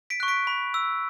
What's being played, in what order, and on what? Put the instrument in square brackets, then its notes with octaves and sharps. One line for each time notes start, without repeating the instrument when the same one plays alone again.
[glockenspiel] B6 D7
C#6 F#6
B6 D7
B5
E6